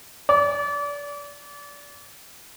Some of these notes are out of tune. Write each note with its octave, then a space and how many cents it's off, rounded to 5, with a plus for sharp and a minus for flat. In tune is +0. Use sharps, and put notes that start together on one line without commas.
D5 -30